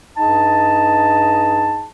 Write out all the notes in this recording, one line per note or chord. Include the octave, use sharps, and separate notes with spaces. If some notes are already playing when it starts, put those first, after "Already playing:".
G2 D#4 G#4 D#5 A5